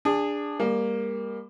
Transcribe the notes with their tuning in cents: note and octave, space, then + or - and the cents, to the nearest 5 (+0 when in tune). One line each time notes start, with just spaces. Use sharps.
D4 +0 G#4 -25
G3 +35 A#3 +0